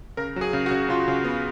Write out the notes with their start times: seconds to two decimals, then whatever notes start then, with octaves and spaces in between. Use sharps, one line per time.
0.17 C#3 A#4
0.36 F#3 G#4
0.53 C#3
0.66 F#4
0.71 C#3
0.89 C#3 F4
1.08 C#3
1.24 B3